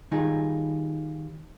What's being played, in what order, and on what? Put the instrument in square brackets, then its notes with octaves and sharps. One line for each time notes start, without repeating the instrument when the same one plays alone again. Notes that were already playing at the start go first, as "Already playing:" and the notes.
[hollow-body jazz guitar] D#3 G3 D#4 F4 G#4